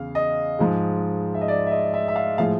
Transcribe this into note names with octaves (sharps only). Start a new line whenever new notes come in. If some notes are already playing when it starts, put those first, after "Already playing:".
Already playing: E2 C#3 F5
D#5
G#2 F3 G#3
E5
D#5
D5
E5
D#5
E5
E5
F5
A2 F3 G#3 F5